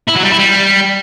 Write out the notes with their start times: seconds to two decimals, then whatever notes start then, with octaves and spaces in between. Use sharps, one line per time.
0.08 E4
0.15 F#3
0.23 G3
0.31 E4
0.39 G3